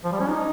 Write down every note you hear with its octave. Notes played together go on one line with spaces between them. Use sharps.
F3
G3
C#4
D#4